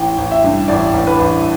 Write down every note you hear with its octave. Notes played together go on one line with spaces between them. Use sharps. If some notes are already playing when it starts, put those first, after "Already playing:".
Already playing: A1 G5
A1
E5
G2
A1 D5
A1
B4
A1